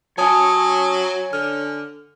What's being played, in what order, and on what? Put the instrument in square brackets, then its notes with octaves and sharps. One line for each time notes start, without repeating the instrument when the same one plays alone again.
[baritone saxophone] F#3 [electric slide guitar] C#5 G#5 [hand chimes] A5 D#6
[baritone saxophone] D3 [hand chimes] F6